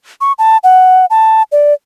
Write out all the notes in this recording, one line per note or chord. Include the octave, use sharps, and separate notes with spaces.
C#6
A5
F#5
A5
D5